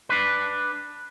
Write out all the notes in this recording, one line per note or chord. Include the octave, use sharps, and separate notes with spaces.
D4 B4